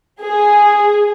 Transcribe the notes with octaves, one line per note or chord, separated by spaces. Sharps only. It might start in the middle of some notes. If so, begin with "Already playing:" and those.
G#4